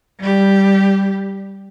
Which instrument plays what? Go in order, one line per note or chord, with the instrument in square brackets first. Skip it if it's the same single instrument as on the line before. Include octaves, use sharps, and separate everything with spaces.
[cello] G3 G4